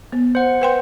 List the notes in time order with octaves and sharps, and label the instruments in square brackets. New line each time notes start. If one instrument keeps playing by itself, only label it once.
[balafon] B3
[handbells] C5 F#5
[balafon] B4 G5 C6